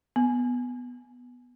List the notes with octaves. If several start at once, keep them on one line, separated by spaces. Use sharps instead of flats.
B3